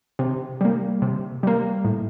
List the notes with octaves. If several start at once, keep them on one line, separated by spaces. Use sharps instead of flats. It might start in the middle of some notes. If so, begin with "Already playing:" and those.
C3
G3 A#3
C3
G3 A#3
A2